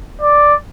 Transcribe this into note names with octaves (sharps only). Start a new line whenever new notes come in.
D5